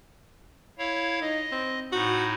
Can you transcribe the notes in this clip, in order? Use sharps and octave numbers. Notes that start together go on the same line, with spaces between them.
E4 C#5 F5
D#4 D#5
C4
A2 D#4 F#4